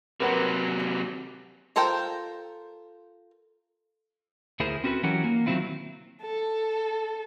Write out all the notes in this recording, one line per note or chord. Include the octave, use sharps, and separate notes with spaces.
C3 F#3 A#4 B4 F#5
F4 A4 A#4 C5 G5
D2 E4 G#4 A#4 C5
C4 C#4 F#4 A4 B4
E3 F#3 C#4 F#4 G4 A#4
A#3
D#3 F#3 A#3 C4 E4 F4
A4